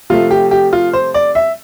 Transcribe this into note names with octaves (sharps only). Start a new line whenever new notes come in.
C3 F3 A3 F4
G4
G4
F4
C5
D5
E5